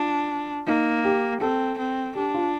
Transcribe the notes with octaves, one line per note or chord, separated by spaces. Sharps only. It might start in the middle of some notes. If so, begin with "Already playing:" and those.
Already playing: D4 F4
A#3 D#4
G4
C4 A4
C4
D4 G4
F4